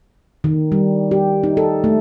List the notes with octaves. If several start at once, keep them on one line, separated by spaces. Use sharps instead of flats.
D#3
G3
G4
D#4
A4
A3